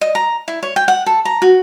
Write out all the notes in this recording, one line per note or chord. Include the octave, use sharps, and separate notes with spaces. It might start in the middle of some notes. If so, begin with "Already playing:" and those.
D#5
A#5
E4
C#5
G5
F#5
A4
A#5
F#4